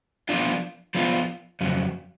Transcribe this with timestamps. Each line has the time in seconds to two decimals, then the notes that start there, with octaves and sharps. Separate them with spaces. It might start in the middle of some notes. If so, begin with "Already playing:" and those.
0.29 F3 B3 D4 F4
0.95 F3 B3 D4 F4
1.61 F2 C#3 F#3